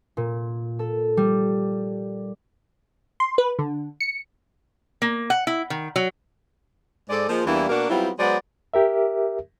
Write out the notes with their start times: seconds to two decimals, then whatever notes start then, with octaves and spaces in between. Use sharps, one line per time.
0.17 A#2
0.79 A4
1.17 G3
3.20 C6
3.38 B4
3.59 D3
4.01 C#7
5.02 A#3
5.30 F#5
5.47 E4
5.70 D#3
5.96 F#3
7.09 G#2 G#3 A4 D5
7.29 F3 G#3 A#3
7.46 E2 E3 G3 A#3 D4 E4
7.69 B2 A#3 D4 F#4 A#4
7.90 F#3 G3 B3 C4 E4 F4
8.19 F#3 G#3 B3 C5 D5
8.74 G4 A#4 E5